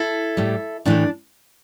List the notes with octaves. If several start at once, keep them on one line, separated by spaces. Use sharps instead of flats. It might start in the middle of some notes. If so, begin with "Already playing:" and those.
Already playing: E4 A4
A2 G3
A2 E3 A3 D4